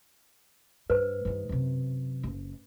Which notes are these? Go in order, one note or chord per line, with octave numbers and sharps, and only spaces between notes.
G2 B4 C5
G2 D#3
F#2 C3
F#1